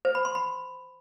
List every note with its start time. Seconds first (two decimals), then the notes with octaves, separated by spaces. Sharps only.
0.05 C5
0.15 B5
0.25 C6
0.35 B5